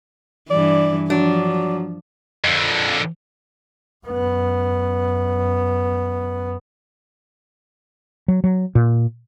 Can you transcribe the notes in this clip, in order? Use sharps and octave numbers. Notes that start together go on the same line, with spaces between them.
G2 E3 D5
F3 F#3 D4
F2 D3
F#2 B3
F#3
F#3
A#2